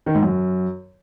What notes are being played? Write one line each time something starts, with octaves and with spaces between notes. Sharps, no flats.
D#3
G#2
F#2